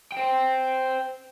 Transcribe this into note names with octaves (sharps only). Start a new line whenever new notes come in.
C5 G5